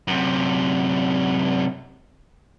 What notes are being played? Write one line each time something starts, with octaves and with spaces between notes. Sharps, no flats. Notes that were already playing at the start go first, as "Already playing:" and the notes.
F#2 C3